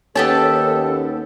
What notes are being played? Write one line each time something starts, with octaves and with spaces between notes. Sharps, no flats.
D#2 B3 C#4 G4 A4 A5